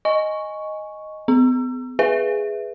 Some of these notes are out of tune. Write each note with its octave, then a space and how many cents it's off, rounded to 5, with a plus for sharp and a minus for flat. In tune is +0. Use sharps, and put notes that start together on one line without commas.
D#5 +0 G#5 +0 C#6 +0
B3 +40 E6 +35
G#4 +0 B4 +0 E5 +0